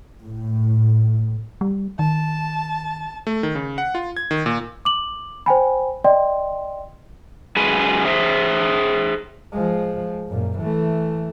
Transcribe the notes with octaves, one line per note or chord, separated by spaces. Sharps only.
A2
G3
D#3 A5
A3
D#3
C#3
F#5
F4
G#6
D#3
A#2
D6 F#7
C5 G5 G#5 B5
D5 D#5 G5 C6
F#2 G#3 B4 G#5
G#4 C5 E5
F3 G#3
F#2 A#2
E3 A3